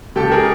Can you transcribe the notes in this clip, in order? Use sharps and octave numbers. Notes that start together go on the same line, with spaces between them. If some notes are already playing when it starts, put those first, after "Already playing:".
C#2 G4 A4
G#4 A#4